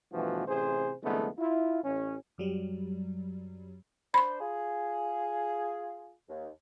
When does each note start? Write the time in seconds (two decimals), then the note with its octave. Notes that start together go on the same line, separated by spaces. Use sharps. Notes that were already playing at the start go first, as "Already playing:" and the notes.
0.13 G2 B2 E3 F3 A3 F#4
0.47 A1 C3 G#4 C5
1.03 C2 F2 D3 G#3 A3 B3
1.39 E4 F4
1.83 A1 C#4
2.38 F#2 F#3 G3
4.14 D4 C5 B5 C6
4.41 F4 G#4
6.29 D#2